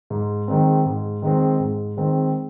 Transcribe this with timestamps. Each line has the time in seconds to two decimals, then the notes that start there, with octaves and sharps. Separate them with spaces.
0.10 G#2
0.48 D#3 G#3 C4
0.86 G#2
1.22 D#3 G#3 C4
1.60 G#2
1.97 D#3 G#3 C4